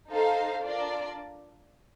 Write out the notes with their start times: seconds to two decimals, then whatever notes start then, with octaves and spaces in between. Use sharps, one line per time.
0.10 D#4 A4 C5 F5
0.63 D4 F4 A#4 D5